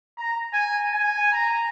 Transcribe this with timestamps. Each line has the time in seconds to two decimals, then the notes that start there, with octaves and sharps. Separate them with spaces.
0.18 A#5
0.53 G#5
0.92 G#5
1.32 A#5